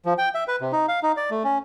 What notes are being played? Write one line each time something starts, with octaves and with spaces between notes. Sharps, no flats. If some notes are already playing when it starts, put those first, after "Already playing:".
F3
G5
E5
B4
C3
D#4
F5
D#4
D5
A3
C#4